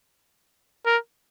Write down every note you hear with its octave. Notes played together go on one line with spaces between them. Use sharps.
A#4